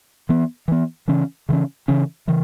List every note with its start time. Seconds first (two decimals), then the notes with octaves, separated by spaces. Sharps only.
0.29 E3 B3
0.68 E3 B3
1.08 C#3 E3 C#4
1.49 C#3 E3 C#4
1.88 C#3 E3 C#4
2.28 C#3 E3